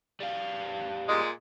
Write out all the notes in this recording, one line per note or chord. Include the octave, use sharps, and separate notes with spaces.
G3 F5
A#2 G#3